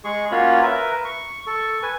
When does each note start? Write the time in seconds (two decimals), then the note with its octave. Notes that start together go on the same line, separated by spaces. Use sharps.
0.04 G#3 G#4 C#6
0.31 A#3 C#4 F4 F#4 C#5 B5
0.62 A#4 B4 E5
1.05 C#6
1.47 A4 C#6
1.83 B4 G#5